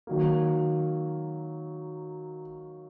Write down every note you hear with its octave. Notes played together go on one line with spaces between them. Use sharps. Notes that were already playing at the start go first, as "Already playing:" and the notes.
D#3 F#3 A#3